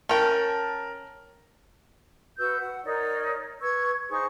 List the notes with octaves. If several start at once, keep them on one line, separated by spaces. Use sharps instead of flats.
C#4 A#4 G5 A5
F#4 B4 E6 G6
F#5
D#4 A#4 C#5 D5
B4 C#6 E6 G#6
D#4 G#4 C5 C#6